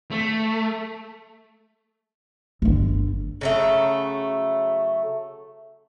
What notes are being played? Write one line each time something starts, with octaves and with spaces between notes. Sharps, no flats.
A3
G1 D3
C#3 F#3 A3